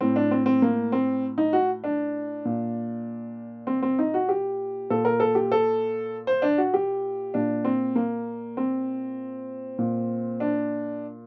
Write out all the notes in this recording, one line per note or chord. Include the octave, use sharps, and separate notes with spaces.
A2 C4
D4
C4
C4
A#3
C4
D#4
F#4
D4
A#2
C4
C4
D#4
F#4
G4
A#2 A4
A#4
A4
G4
A4
C5
D4
F#4
G4
A#2 D4
C4
A#3
C4
A#2
D4